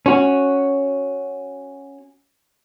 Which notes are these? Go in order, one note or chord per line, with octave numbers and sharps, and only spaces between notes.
C#4 F#4